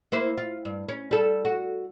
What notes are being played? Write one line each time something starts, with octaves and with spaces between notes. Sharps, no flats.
A#3 E4 C5
F4
G2
C#4
G3 A4
F#4